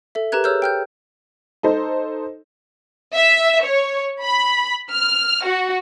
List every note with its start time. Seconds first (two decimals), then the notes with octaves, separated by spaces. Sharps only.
0.15 A4 E5
0.32 G4 A#4 B4 A#5 F#6 G#6
0.44 G4 G#4 C#5 E6 F6 G6
0.62 G5 F6 G6
1.63 D#4 A4 C5
3.14 E5
3.64 C#5
4.22 B5
4.92 F6
5.45 F#4